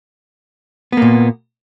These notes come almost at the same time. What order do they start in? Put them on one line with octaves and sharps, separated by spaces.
B3 A#3 A#2